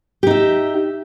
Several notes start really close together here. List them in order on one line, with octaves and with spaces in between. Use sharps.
G4 D#4 E5